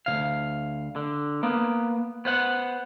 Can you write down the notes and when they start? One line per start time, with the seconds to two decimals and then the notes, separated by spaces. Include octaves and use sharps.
0.06 D2 C#3 F5
0.96 D3
1.43 A#3 B3
2.25 B3 C5 F#5